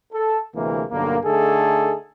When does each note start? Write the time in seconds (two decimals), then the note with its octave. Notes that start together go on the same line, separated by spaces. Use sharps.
0.13 A4
0.54 D2 C3 E3 G#3 A#3
0.91 B1 G2 D3 A#3
1.25 D3 A3 D#4 G#4 A4